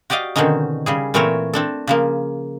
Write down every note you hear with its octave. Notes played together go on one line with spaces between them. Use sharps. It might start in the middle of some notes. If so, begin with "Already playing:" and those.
F#4 G4 D5 D#5 F5
B2 D3 D#3 C4 C#4 D#4
C#3 G3 G#4
A#2 E3 A3 C4 A#4 C#5
C4 D4 A4
C#3 F3 A#3